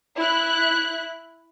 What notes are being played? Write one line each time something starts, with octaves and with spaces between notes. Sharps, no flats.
E4 F#6